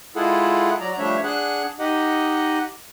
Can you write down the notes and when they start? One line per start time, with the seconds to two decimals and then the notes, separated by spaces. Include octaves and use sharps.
0.16 G#3 E4 F4 G#4 A4 F#5
0.80 F#3 D5 A#5
0.98 F3 G3 A3 D4 C#5 E5
1.24 D4 G#4 F#5 F#6
1.80 D#4 G4 D#5 F#5